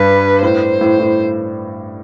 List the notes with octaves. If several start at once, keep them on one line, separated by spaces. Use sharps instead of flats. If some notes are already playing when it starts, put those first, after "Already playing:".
Already playing: G2 B4
A2 C5
A2
A2